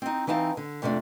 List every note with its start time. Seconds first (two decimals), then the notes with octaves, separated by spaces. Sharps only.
0.02 C4 D#4
0.27 E3 C4 D#4 F5 A5
0.57 D3
0.82 F2 C3 A3 C#4 D4